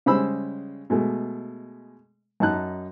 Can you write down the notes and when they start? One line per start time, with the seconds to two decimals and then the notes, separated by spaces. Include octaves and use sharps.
0.06 C#3 G3 G#3 C5 B5 E6
0.90 B2 G#3 A3
2.40 F#2 D#4 A5 F#6